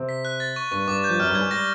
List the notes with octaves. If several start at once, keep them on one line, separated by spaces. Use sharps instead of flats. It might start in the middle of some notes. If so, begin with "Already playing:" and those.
Already playing: C3 C4
B6
F#6
A6
C#6
G2 G3 C#6
G2 G3 D6
G6
F3
F#2 F#3 F6
G2 G3
G#6
G#2 G#3
G3 A#6